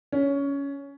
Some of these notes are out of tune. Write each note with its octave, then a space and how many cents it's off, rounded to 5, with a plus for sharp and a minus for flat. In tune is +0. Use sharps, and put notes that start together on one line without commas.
C#4 +15